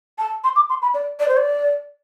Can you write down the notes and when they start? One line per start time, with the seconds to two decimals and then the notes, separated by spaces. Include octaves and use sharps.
0.18 A5
0.44 C6
0.56 D6
0.69 C6
0.82 B5
0.94 D5
1.20 D5
1.28 C5
1.37 D5